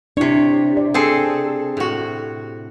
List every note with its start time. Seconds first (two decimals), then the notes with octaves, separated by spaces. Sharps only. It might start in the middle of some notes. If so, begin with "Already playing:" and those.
0.17 C3 D4 E4 C#5
0.77 D5
0.94 C4 G#4 A4
1.77 A2 F#4